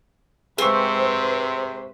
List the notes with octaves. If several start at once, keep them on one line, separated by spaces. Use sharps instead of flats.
G#2 C3 C4 G#4 B4 C5 C#6